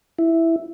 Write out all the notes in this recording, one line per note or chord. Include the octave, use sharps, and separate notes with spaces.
E4